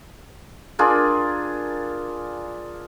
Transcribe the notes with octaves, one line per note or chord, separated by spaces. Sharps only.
D4 F4 G#4 A#4